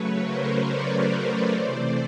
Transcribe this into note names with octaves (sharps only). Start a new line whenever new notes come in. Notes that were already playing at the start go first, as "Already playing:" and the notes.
Already playing: C#3 F#3 A3 B4 C#5
A#4 C5
C5 D5
C5 D5
C3 E3 A3 C5 D5